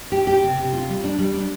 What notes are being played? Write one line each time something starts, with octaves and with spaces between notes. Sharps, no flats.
G4
G4
C3
C3
F4
G3
D4
G3
D4